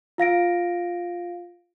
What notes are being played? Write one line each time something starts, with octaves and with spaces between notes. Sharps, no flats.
F4 F5 A#6 D7